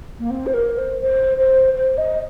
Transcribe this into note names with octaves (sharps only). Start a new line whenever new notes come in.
A#3
C4
C5
A#4
C5
C5
C5
C5
D#5